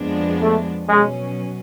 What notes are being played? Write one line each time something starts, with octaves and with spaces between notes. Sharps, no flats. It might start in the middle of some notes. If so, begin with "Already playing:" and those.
Already playing: F2 F3 G#3 B3 D4
A3
B2 F#3 G#3 C#4